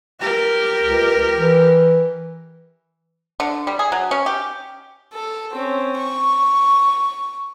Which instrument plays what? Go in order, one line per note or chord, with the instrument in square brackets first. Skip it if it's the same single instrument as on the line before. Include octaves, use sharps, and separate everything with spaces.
[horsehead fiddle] G4 A#4
[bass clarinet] C#2
E3
[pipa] D3
G3
G#4
F#3
C#4
G4
[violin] A4
C4 C#4
C#6